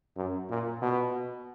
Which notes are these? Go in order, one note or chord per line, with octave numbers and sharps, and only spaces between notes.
F#2
A#2
B2